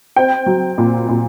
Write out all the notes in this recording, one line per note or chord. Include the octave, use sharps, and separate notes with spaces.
C4 G5
F#3
A#2
A#2